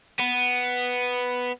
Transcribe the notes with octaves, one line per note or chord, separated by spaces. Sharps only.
B3